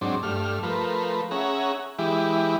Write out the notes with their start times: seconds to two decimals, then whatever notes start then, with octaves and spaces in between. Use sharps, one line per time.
0.01 G#2 F#3 C4 D4
0.23 G2 A3 F6
0.63 F3 A3 A#4 B4
1.31 C#4 G#4 E5 F#5 A#5
1.99 E3 G#3 E4 G4